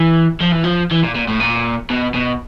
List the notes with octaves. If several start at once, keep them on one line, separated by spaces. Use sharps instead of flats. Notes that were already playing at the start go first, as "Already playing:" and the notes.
Already playing: E3
F3
E3
F3
E3
A#2
A#2
A2
A#2
B2
B2